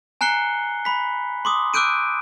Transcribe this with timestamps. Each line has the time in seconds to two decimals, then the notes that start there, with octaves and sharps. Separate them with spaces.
0.21 G#5 A#5 F#6 C7 C#7 G7
0.85 B5 B6
1.45 C6 D6 D#6
1.74 D6 E6 F#6 G6 D7 D#7